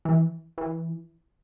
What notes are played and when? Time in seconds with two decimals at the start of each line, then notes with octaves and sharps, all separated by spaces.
0.05 E3
0.58 E3